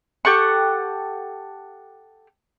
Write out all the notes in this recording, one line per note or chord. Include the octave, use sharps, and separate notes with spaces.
G4 A4 F#5 C#6